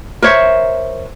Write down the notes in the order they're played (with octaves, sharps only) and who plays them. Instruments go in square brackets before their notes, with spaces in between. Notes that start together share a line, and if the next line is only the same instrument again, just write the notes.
[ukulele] A#4 C5 C#5 E5